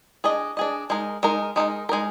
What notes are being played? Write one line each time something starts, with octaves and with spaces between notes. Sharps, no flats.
D4 G#4 D#5
D4 G#4 D#5
G#3 D#4 A#4
G#3 D#4 A#4
G#3 D#4 A#4
G#3 D#4 A#4